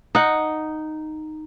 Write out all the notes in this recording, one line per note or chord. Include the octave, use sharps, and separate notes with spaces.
D#4 F#5